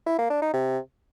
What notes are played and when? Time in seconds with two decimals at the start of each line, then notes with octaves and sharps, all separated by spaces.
0.06 E4
0.18 A#3
0.30 D4
0.42 D#4
0.54 C3